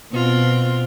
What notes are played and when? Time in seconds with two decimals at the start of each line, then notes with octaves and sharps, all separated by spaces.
0.11 B2 C4 F4